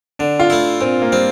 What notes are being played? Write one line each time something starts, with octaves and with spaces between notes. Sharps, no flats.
D3 D4
F4
A3 E4
A#2 C4
A#3
G3 C4